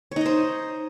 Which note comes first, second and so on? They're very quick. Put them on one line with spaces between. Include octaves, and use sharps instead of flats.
C#5 D#4 D#5 C5